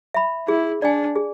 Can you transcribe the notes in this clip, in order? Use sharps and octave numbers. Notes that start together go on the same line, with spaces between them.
E5 B5
E4 G#4
D4 D5 G#5
G#4